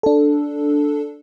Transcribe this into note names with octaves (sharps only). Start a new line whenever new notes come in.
D4 A4